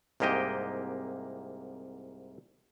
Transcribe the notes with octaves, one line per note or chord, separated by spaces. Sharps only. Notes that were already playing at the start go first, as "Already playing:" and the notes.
C2 G#2 A#3 G4 D#5 G5